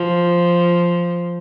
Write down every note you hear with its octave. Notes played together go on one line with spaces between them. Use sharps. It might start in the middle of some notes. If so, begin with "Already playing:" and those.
Already playing: F3